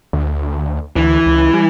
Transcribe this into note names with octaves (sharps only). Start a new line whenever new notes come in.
D2
D2 E3
C#2
G3